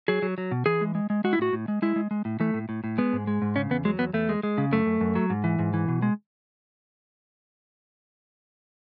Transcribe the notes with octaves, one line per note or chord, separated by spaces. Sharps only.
F#3 G#4
F#3
F#3
B2
E3 G#4
G#3
G#3
G#3
G#3 F#4
E4
A2 F#4
A2
G#3
G#3 E4
G#3
G#3
A2
E3 A3
A2
A2
A2
G#3 B3
G#2
G#3
G#2
C#3 C#4
E2 B3
F#3 G#3
E2 B3
E2 A3
G#3
G#3
C#3
F#2 A3
F#2
F#2
F#3
G#2
E3
G#2
E3
B2
G#3